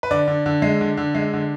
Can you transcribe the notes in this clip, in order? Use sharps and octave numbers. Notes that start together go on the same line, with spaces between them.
B4
D3 D5
D3
D3
G#3
D3
D3
G#3
D3